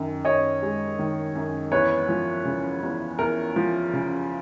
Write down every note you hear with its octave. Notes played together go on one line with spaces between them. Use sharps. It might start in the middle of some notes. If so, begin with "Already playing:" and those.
Already playing: F#2 D#3
F#2 C#5 D#5
G#3
D#3
F#2
E2 B4 C#5
F3
C#3
E2
E2 A#4
F3
C#3